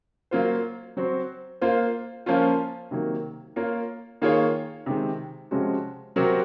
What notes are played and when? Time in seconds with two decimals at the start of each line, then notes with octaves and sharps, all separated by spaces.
0.31 F#3 A#3 F4 C5
0.97 F#3 C4 F#4 C5
1.61 A#3 F4 C5
2.26 F3 A#3 C#4 F4
2.91 C3 D#3 F#3 A#3
3.56 A#3 F4 A#4 C#5
4.22 D#3 A#3 F4 G#4 C#5
4.86 C3 D#3 G#3
5.51 C3 F3 G#3 C#4 F#4
6.16 C3 F#3 C4 F#4 A#4